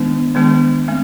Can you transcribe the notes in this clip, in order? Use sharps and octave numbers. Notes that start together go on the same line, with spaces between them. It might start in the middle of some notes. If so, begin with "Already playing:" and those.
Already playing: D#3 G#3 B3 D4
D#3 G#3 B3 D4
A3 C4